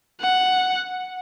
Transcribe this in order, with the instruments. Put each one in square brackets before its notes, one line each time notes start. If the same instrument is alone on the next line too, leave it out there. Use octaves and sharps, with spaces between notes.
[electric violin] F#5